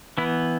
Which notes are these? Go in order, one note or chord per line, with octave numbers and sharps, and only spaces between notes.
E3 B3 E4